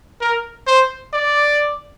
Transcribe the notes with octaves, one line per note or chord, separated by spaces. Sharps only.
A#4
C5
D5